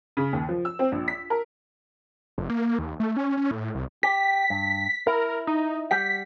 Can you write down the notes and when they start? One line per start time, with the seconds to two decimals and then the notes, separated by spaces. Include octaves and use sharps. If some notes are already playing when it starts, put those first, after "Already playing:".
0.17 C#3
0.33 D#2
0.49 F3
0.65 E6
0.79 C4
0.92 A#1
1.08 B6
1.30 A#4
2.38 F1
2.50 A#3
2.79 D#2
3.00 A3
3.17 C#4
3.37 C#4
3.51 A2
3.75 C2
4.03 G4 B6
4.50 G2
5.07 E4 A#4
5.47 D#4
5.91 G3 G4 F#5 B6